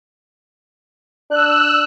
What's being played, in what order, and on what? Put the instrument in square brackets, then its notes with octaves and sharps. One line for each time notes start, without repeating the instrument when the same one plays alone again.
[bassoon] D4 [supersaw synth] E6 F#6